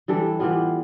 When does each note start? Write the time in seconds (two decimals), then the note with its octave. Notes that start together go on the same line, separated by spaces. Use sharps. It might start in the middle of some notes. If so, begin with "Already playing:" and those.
0.08 E3 G3 D4 A4
0.40 E3 G3 B3 F4